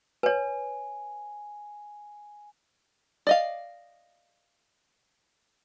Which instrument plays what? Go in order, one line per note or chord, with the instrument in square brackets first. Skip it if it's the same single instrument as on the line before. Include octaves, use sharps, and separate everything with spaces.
[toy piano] B4 C#5 [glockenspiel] G#5
[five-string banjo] D5 D#5 F5